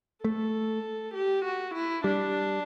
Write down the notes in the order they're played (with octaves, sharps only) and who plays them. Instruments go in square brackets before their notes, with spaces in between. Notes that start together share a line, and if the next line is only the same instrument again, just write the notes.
[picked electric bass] A3 [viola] A4
[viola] G4
F#4
E4
[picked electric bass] G3 [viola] D4